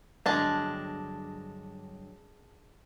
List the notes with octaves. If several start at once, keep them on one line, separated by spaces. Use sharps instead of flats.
G2 D3 F#3 G#3 D4 A5